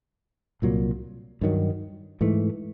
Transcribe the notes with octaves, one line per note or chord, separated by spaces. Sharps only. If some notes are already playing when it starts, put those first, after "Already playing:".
C2 A#2 F#3 A#3
G2 D#3 F#3
G#2 E3 A3